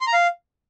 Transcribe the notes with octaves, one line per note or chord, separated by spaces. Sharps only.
C6
A#5
F5